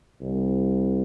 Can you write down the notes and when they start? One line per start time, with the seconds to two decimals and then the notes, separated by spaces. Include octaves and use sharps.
0.21 C2